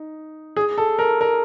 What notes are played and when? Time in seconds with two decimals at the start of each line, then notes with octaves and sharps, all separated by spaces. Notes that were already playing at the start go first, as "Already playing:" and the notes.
Already playing: D#4
0.56 G#4
0.78 A4
0.99 A#4
1.21 A#4